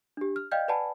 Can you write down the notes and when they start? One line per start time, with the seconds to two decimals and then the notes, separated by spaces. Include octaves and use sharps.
0.17 D4 G4
0.36 F6
0.52 D5 D#5 F5 G5 F6 G6
0.68 B4 D5 F#5 G#5 A5 B5